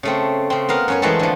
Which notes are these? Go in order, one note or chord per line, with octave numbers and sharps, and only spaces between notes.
C#3 A3 C4
C#3 C4
B3 A#4 F5
F#2 C#4 C#5
E3 G#3 A3 B3 C4 A4
D3 F3